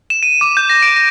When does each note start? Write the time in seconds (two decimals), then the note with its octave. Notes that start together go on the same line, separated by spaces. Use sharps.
0.10 E7
0.23 D#7
0.41 D6
0.57 G6
0.70 A#6
0.82 D7
0.96 A#6